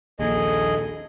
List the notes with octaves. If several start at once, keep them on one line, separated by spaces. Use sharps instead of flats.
A#1 D#2 G#4 A4 D#5